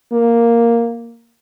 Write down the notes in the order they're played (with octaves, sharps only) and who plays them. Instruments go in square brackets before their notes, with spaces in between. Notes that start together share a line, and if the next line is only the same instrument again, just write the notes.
[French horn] A#3